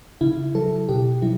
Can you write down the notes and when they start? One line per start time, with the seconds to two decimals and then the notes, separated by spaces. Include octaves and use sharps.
0.21 C#3 E4
0.55 F#3 A4
0.89 B2 G4
1.22 F#3 E4